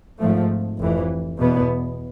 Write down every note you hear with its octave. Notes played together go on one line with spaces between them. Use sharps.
G#1 G#2 F3 A3
F1 F2 E3
E2 B2 B3